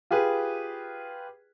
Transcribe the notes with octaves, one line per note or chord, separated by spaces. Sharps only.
F4 G4 G#4 B4